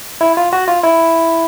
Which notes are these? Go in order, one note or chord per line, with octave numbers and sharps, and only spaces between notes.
E4
F4
F#4
F4
E4